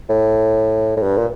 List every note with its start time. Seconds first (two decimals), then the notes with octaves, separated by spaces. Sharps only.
0.09 A2
0.97 A2
1.03 G2
1.17 A#2